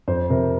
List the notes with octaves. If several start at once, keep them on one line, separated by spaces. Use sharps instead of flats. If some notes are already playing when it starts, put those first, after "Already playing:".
F2 C5
C3 A#4